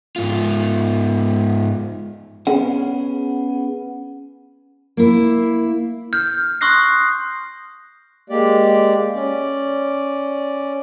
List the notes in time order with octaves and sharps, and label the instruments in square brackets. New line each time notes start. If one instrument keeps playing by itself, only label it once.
[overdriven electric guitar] G#2 F4
[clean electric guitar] B3 C#4 G#4 F#5
[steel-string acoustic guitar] A#3 E4
[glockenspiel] F6 G6
C6 C#6 D#6 F#6 A#6 C7
[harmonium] G#3 A#3 G4 D5
C#4 D5